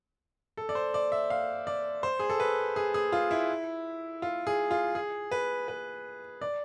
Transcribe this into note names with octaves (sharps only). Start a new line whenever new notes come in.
A4
D5
C5
D5
E5
F5
D5
C5
G#4
A4
B4
G#4
G#4
F4
E4
F4
G#4
F4
G#4
B4
B4
D5